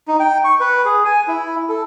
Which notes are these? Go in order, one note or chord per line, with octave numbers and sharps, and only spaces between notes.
D#4
G5
C#6
B4
G#4
G#5
E4
A4